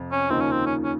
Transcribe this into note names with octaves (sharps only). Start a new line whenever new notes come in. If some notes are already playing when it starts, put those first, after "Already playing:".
Already playing: F2 C3
C#4
D#2 C#3 F3 A#3 C4 D#4
C#4
C4
C#4
C#4